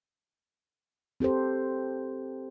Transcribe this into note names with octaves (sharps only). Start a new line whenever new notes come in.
C4 G4 A4 C5